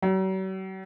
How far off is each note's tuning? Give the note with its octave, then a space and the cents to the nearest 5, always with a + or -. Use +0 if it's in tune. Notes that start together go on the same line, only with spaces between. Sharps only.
F#3 +45